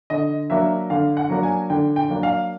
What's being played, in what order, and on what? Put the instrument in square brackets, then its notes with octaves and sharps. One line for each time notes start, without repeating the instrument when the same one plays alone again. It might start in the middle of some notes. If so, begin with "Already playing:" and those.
[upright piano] D3 D#5
F#3 A#3 D4 E5
D3 F5
F#5
F#3 A#3 D4
G#5
D3 G5
G5
F#3 A#3 D4
F5